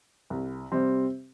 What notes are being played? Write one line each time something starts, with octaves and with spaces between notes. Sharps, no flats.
C2
C3 G3 C4